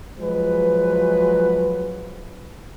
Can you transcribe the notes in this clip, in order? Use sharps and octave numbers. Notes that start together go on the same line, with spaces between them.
F3 F#3 G#3 B4